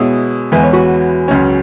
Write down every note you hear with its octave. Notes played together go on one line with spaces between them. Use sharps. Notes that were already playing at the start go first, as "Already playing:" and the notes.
Already playing: B2 G#3 E4 G#4 C#5
E2 E3 G#3 B4
C#5
F#4 B4
C#2 C#3 F#3 C#4